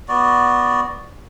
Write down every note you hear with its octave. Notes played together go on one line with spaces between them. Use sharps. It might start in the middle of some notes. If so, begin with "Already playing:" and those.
B3 F#4 D5